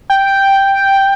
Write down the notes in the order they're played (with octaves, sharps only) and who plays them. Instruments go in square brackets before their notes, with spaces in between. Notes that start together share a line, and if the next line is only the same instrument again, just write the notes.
[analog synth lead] G5